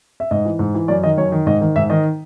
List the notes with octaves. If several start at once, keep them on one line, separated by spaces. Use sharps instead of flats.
E5
G#2 D#5
E3
G#2
E3
F#2 D5
D#3 D#5
F#2 C#5
D#3
G#2 D#5
D#3
G#2 E5
D#3 D#5